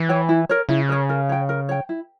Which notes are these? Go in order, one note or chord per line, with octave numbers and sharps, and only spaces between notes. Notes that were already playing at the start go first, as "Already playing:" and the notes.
Already playing: E3
C#5 G5
E4
A#4 C#5
C#3 E4
A#4 C#5
A#4
C#5 G5
A#4
C#5 G5
E4